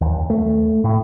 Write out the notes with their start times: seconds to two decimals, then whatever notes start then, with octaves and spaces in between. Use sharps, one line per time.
0.01 D#2
0.30 A3
0.84 A2